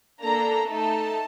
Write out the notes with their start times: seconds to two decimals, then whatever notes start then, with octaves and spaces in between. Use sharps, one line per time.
0.21 A#3 D4 A4 A#5
0.69 A3 D#4 A4 A5